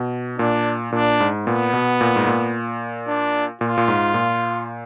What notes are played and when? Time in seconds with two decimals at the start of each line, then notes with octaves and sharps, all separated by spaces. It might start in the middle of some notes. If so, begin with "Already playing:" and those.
Already playing: B2
0.39 A#2 D4
0.92 A#2 D4
1.20 G#2
1.46 A#2 B3
1.73 B2
2.01 A#2
2.16 G#2
2.27 A#2
3.08 D4
3.61 A#2 F4
3.78 A#2
3.88 G#2
4.14 A#2